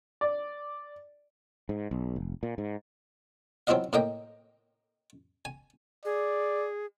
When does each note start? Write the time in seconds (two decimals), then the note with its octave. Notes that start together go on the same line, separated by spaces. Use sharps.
0.21 D5
1.69 G#2
1.91 B1
2.16 F1
2.43 A#2
2.58 G#2
3.67 F#3 C4 E4 F4 D#5 F5
3.93 A2 A#3 D#5 G5
5.45 G#5
6.05 G#4 D5